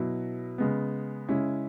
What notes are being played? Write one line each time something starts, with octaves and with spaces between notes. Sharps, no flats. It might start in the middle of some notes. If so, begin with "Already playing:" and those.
Already playing: B2 F#3 E4
C#3 G#3 B3
C#3 G#3 C#4 E4